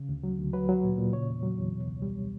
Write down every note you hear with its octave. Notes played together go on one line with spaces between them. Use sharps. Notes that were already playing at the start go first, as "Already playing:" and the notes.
Already playing: C#3
D2
F#3
D2
F#3 B4
F#3
A#2
A#2
C#3 C#5
E2
F#3
E2
B2
C#2
G3